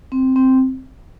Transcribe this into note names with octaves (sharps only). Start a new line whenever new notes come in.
C4
C4